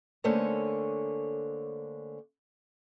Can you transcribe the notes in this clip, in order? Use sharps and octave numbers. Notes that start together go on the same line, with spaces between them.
D3 A3 A#3 C#4 C5 C#5